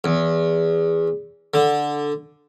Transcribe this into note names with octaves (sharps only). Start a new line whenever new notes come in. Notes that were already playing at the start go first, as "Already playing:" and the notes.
E2
D3